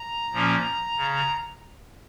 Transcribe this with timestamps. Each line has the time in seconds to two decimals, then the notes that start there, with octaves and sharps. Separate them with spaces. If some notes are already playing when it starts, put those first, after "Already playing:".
Already playing: A#5
0.32 A#2 F3 A#3 C#4
0.97 C#3